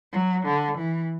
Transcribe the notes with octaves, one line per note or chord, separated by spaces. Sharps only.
F#3
D3
E3